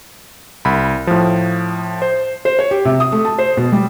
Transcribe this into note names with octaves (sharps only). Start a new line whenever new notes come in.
C2 B5
A2 F3
C5
C5
C#5
G4
C3
D#6
A3
A5
C5
B2
G3